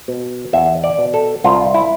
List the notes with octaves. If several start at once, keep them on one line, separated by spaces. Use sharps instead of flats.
B2
E2 E5
D5
B2
A4
C2 F4
E4